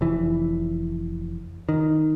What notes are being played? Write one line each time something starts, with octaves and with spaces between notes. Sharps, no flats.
F1 E3
D#3